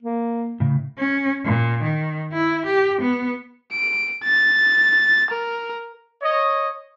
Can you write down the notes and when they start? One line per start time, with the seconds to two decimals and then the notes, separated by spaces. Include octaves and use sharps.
0.03 A#3
0.60 A2 C#3
0.98 C#4
1.45 A#2
1.83 D#3
2.33 E4
2.66 G4
3.01 B3
3.72 D7
4.24 A6
5.30 A#4
6.22 C#5 D#5